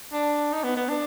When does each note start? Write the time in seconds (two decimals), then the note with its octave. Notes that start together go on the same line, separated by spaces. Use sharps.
0.13 D4
0.52 D#4
0.64 B3
0.77 B3
0.89 D4